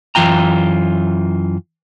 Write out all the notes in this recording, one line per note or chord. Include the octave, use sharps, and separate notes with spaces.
F#2 E3 F4 G5 A#5